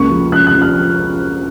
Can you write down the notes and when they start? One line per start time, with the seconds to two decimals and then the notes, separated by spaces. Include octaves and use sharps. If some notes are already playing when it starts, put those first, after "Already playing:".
Already playing: C#2 A#3 C#6
0.10 F3
0.32 C#2 F#6
0.47 F#6
0.54 F3
0.62 F6